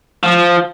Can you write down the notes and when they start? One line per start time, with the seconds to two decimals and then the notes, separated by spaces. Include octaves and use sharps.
0.23 F3